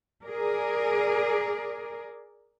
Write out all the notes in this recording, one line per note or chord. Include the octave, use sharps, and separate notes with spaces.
G#4 A#4 D5